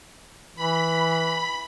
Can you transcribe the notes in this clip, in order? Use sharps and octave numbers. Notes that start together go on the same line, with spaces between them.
E3 B5